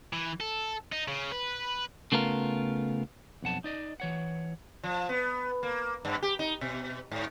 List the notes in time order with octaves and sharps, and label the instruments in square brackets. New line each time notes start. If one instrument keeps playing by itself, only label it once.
[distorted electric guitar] E3
A4
D#4
C#3
B4
[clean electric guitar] C#3 A3 B3 F4 A#4
B1 F2 F#5 A5
D#4 D5 D#5
E3 C#5 F#5
[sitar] F3
B3
A#3
G2
G4
D#4
B2
G#2